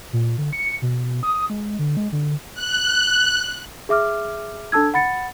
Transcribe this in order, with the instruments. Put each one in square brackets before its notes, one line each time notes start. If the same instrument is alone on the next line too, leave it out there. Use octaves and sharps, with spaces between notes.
[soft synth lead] A#2
D3
C#7
B2
D#6
G#3
D3
G#3
D3
[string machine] F#6
[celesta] G#4 E5 D6 F6
D4 A4 A5 E6 G#6
F#5 B5 A6 C#7